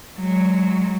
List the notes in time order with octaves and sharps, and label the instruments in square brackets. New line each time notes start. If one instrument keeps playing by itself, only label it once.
[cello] F#3 G#3